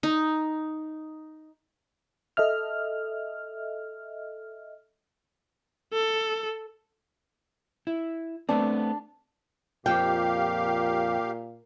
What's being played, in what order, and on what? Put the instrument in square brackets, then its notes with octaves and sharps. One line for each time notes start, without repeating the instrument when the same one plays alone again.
[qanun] D#4
[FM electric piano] A4 D#5 E5 F6
[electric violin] A4
[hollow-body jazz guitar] E4
[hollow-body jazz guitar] A3 B3 C4 [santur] D4
[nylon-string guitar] F2 G5 [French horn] A#2 [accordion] G4 F5